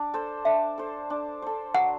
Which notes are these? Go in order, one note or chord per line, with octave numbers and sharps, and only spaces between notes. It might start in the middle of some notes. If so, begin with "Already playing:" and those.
Already playing: D4
A4 C5
D4 E5
A4 C5
D4
A4 C5
F#3 F#5